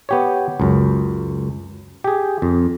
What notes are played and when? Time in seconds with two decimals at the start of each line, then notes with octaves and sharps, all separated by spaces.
0.09 B3 G4 C#5
0.60 C#2 F#2
2.04 G4 G#4
2.42 F2